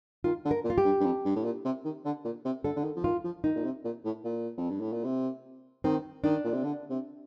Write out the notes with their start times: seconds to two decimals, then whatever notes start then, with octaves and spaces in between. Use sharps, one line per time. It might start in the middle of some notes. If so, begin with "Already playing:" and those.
0.24 D#3 F4
0.45 D3
0.51 A#4
0.64 A#2
0.70 F4
0.78 G4
0.84 G2
1.00 G2
1.04 F2
1.25 G2
1.35 A2
1.44 A#2
1.64 C3
1.84 D#3
2.05 D3
2.24 A#2
2.44 C3
2.64 D3 A4
2.76 D3
2.84 D#3
2.96 F3
3.04 D#3 F4
3.24 F3
3.44 D#3 D#4
3.55 A#2
3.64 C3
3.84 A#2
4.04 A2
4.24 A#2
4.57 F2
4.70 G2
4.81 A2
4.92 A#2
5.04 C3
5.84 D#3 C4
6.24 D#3 D4
6.44 A#2
6.54 C3
6.63 D3
6.90 C3